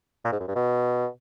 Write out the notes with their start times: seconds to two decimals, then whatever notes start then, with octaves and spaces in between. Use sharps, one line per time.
0.24 A#2
0.32 G#2
0.40 F#2
0.48 G2
0.55 B2